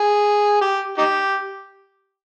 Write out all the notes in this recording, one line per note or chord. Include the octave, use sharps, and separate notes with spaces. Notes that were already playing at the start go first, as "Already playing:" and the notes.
Already playing: G#4
G4
D#4 G4